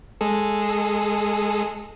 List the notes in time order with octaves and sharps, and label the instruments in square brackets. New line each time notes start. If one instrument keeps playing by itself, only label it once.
[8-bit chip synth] G#3 G#4 A4